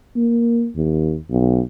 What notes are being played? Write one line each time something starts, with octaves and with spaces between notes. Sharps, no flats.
A#3
D#2
B1